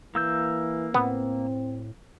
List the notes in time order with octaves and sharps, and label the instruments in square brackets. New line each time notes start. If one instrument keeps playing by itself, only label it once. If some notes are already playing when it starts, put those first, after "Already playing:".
[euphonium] E3 [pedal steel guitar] A#3 E6 G6
[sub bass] A2 [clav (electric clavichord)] B3 [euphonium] C4